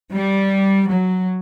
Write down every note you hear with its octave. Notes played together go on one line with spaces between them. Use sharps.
G3
F#3